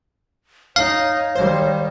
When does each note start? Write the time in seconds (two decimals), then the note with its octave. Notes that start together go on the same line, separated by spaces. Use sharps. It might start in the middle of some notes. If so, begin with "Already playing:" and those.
0.76 D#4 C#5 F5
1.36 D#3 G3 C5